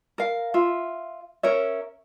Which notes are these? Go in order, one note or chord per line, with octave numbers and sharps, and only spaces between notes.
A#4 F5
F4 E5
C#4 A#4 C#5 E5